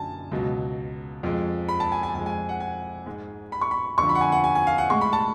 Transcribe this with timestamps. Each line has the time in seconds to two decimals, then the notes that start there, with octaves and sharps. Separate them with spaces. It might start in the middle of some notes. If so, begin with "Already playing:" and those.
Already playing: F#2 D3 F#3 G#5 A5
0.31 C#2 B2 F#3
1.23 F2 F3 G#3
1.69 B5
1.80 A5
1.92 G#5
2.03 G#5
2.15 F2 F3 G#3 G#5
2.26 G#5
2.49 F#5
2.60 G#5
3.06 G#2 G#3
3.52 B5
3.61 C#6
3.71 B5
3.98 F2 D3 F3 C#6
4.09 B5
4.15 F#5
4.21 G#5
4.32 F#5
4.44 G#5
4.55 G#5
4.67 F5
4.78 F#5
4.90 A2 G#3 C#6
5.01 B5
5.13 A5